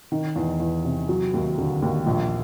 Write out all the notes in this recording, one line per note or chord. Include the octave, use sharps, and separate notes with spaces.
D#3
E2
E2
C3
F#3
D#2
D3
D#2
A#1